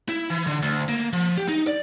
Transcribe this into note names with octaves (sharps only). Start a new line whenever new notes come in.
E4
E3
D3
D2
A#3
F3
G4
D#4
D5